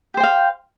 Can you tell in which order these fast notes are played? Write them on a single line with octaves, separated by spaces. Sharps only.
G4 C5 G5 F5